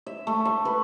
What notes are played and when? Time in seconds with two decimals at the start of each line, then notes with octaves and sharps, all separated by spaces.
0.06 E5
0.27 A3
0.45 C#6
0.65 B4